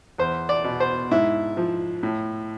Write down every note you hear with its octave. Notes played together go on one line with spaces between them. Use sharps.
E2 C5
D5
B2
C5
G#2 E4
F3
A2